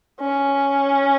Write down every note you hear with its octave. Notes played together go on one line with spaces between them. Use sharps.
C#4